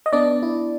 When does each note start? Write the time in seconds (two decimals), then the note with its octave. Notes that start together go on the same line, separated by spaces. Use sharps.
0.06 D#5
0.12 B3 D4 D5
0.43 E4